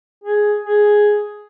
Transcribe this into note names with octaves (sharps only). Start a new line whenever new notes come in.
G#4
G#4